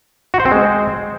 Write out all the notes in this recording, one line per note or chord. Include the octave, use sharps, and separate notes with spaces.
F#4
C5
C4
G#3